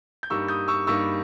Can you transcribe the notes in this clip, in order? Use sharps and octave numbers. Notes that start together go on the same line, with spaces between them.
G6
G2 G3 A#3 D#4 C#6 E6
D#6 G6
C#6 E6
G2 G3 A#3 D#4 C#6 E6